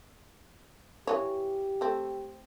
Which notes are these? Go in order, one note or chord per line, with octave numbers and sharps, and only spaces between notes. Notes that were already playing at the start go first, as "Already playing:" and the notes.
E3 A3 G4 C#5
A3 C4